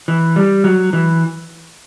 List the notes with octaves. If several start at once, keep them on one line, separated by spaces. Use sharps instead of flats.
E3
G3
F#3
E3